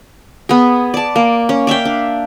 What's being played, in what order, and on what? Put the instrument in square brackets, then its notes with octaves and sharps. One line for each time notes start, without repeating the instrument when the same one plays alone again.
[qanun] B3 G#4
D5 A5
A#3
C#4
D5 E5 F5 G5
D4